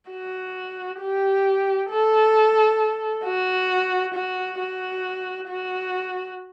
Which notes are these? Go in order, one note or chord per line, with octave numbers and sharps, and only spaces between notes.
F#4
G4
A4
F#4
F#4
F#4
F#4